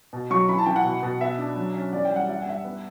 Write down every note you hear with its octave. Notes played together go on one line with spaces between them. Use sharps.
B2
F#3 C#6
E3 B5
A5
E3 G5
F#5
B2
B2
B3 E5
D4
F#3
C#4
E2 D5
G5
G3
F#5
G3 E5
F#5
G2 E5
B3